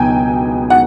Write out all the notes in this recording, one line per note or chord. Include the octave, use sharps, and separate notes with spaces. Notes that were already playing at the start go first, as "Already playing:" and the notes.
Already playing: C#2 B2 F#3 B3 D#4 G5 G#5
F#5